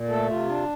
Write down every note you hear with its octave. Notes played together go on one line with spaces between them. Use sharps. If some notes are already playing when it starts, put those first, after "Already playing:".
Already playing: A#2
A3 A4
C3 F4
D4